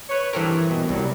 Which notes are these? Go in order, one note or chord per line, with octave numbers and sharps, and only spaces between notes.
B4 C#5
G2 E3 C4 A4 A#4
F#2 B2
C2 F#3 G3